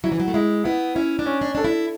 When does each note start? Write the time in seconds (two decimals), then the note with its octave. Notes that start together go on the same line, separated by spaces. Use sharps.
0.04 F#3 E4
0.12 E3
0.20 F#3
0.28 A3
0.34 G#3 E4
0.64 B3 E4
0.95 C#4 E4
1.19 D4
1.26 C#4
1.41 D4
1.55 D4 A4
1.64 E4